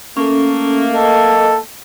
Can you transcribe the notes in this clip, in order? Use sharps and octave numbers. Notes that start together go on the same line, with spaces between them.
A3 A#3 C#4 A4
A4 D#5